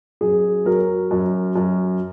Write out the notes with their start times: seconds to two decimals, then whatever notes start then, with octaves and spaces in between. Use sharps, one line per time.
0.21 F#2 G#4
0.65 F#3 A#4
1.11 F#2
1.56 F#2